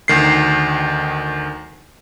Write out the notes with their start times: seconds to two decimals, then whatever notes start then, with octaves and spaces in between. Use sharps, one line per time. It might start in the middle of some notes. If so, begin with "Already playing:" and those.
0.08 D2 D#3 C7